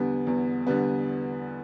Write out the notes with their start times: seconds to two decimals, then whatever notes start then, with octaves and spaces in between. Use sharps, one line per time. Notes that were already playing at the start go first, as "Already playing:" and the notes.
Already playing: E2 D3 G3 B3
0.27 E2
0.67 D3 G3 B3